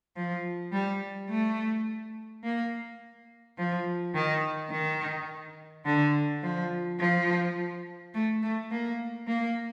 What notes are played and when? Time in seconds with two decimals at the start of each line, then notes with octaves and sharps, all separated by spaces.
0.16 F3
0.72 G3
1.29 A3
2.44 A#3
3.58 F3
4.14 D#3
4.71 D#3
5.85 D3
6.43 F3
6.99 F3
8.14 A3
8.42 A3
8.71 A#3
9.27 A#3